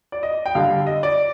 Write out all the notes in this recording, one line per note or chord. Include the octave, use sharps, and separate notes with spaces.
D5
D#5
G5
D3 G3 F5
D#5
D5